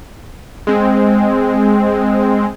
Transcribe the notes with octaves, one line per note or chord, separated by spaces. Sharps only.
G#3 C4